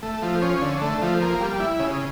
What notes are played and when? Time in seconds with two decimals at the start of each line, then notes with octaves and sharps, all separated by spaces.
0.02 A3
0.22 F3
0.42 C#4
0.61 D3
0.82 A3
1.01 F3
1.21 A#3
1.40 G3
1.60 E4
1.79 C#3